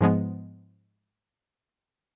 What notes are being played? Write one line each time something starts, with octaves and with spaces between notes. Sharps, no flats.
G#2 F3 G#3 B3